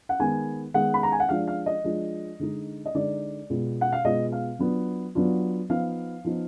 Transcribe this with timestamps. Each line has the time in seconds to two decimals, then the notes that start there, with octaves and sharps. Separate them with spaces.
0.09 F#5
0.19 D#3 G#3 B3 G#5
0.74 D#3 G#3 B3 F#5
0.94 B5
1.03 A#5
1.12 G#5
1.20 F#5
1.29 F3 G#3 D4 F4 F5
1.48 F5
1.66 D#5
1.84 F3 G#3 D4 F4
2.39 D3 G#3 D#4
2.86 D#5
2.94 D3 G#3 D#4 D5
3.50 B2 G#3 B3 F4
3.81 F#5
3.93 F5
4.04 B2 G#3 B3 F4 D#5
4.32 F5
4.59 F#3 B3 D4 F4
5.15 F#3 B3 D4 F4
5.69 F3 B3 D#4 F5
6.24 F3 B3 D#4